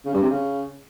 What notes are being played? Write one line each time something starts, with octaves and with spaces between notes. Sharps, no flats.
C#3
G2
C3
C#3